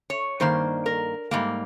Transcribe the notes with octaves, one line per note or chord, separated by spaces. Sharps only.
C#5
G2 D#3 A#3 C5
A#4
G#2 G3 A#3